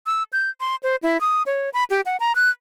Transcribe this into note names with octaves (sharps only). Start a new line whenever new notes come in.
E6
G6
C6
C5
E4
D#6
C#5
B5
G4
F#5
A#5
F#6